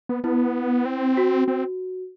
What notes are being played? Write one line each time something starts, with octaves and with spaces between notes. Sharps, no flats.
B3
B3 E4
C4
F#4
C4